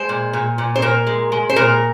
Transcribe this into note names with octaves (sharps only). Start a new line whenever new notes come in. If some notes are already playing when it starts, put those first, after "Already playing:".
Already playing: G#3 C5
A#2
A#2
A#2
C5
A#2 A#4
G#3
G#3
C5
A#2 A#4